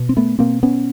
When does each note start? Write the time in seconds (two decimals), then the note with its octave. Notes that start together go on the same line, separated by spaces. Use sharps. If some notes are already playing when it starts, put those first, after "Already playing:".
Already playing: B2
0.09 C4
0.17 A3 B3
0.39 B2 A#3 C4
0.63 B3 C#4